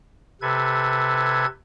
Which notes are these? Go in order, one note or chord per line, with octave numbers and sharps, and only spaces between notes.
C3 A4 B4 G#6